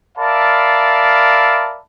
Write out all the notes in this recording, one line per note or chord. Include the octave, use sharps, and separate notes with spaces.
A#4 D5 E5 F5 A5 B5